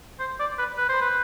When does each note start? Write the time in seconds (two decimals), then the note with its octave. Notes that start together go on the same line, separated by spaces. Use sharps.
0.19 C5
0.39 D5
0.58 B4
0.78 B4
0.89 C5
1.01 B4